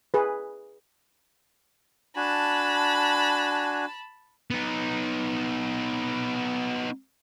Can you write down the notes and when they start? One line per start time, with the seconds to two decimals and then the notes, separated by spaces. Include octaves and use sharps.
0.14 G#4 B4
2.16 D4 F#4 G#5 A5 B5
4.51 B3 D#4